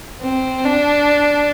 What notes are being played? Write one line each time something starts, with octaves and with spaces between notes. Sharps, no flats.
C4
D4